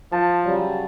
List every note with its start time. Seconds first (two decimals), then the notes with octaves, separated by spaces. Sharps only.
0.12 F3 A5
0.44 C#3 F#3 G3